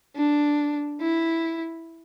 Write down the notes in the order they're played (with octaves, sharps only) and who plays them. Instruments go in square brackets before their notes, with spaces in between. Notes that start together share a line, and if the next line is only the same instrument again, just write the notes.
[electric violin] D4
E4